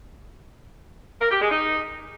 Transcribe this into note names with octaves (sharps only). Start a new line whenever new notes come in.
A#4
G4
G#3
D#4